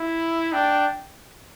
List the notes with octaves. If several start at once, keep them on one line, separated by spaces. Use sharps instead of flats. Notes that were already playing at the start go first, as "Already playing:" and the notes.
Already playing: E4
D4 G5